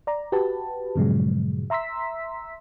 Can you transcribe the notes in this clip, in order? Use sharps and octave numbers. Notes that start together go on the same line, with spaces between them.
D5 A#5
F#4 G4 B4 A5
G2 A#2 C#3 F3 F#3 G#3
E5 A#5 C6 E6 B6